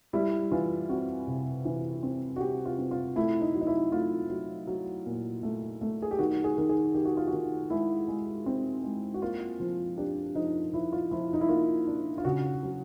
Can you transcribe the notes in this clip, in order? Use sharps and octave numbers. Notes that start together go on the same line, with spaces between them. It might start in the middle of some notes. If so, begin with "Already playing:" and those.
G3 E4
E3 F4
C4 F#4
C3
E3
C4
F#4
C4 G4
F4
C4
F4
A3 E4
D#4
F#3
D#4
E4
A3 F4
F#3
F#3
A#2
A3
A3
G#4
G4
D#3 F#4
G#4
D#3
G#4
D#3 G4
F#4
F4
F#4
D#3
G#3 E4
G#3
C4
G#3
F#4
A#3 F4
F3
D4 G4
F3 D#4
F3 E4
F4
F3 E4
D#4
E4
A#3 F4
D4
F4
C#3 F#4
F#3